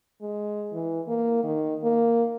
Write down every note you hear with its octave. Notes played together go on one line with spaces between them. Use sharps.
G#3
E3
A#3
D#3
A#3